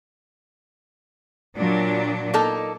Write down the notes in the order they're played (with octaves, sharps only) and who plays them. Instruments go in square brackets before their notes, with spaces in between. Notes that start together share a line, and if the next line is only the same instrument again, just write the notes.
[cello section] A#2 F#3 D4
[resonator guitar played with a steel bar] A#3 D#4 A4